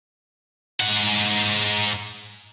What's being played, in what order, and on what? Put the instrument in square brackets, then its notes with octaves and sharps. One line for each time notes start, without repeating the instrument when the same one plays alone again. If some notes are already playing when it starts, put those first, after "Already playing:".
[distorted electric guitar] G#2 F#5